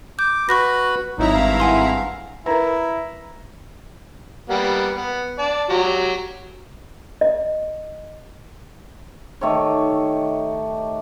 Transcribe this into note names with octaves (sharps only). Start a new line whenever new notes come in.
D6 G6
F#4 B4 B5 C#6 F#6 A#6
G#1 F#3 D#4 E4 A#5
G2 F5
F#5 G#5 C6
E4 A#4 B4 A#5
G3 A#3 B3
B3
D5 A5
F#3 G4 A#5
D#5
D#3 A3 G4 C#5